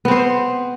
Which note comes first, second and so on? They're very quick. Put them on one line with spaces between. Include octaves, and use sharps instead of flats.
B3 C4 C5